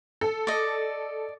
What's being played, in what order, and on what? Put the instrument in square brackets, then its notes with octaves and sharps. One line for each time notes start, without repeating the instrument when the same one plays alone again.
[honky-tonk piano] A4
[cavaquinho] D5 D#5